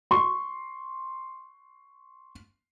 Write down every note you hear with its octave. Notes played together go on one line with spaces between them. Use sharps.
C6 C#6